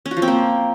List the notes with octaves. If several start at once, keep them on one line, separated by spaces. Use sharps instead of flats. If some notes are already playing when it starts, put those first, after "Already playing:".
C#4
F#4
F3
C4
A#3